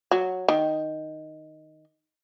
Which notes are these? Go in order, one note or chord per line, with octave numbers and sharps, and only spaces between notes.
F#3
D#3